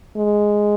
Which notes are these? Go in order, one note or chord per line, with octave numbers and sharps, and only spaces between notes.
G#3